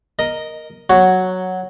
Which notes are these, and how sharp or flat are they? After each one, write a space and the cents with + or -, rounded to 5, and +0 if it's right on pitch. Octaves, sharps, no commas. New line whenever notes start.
A#4 +0 D#5 +0
F#3 +0 F#4 +0 C#5 +0